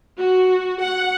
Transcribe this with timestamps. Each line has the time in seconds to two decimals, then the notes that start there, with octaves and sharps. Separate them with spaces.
0.18 F#4
0.81 F#5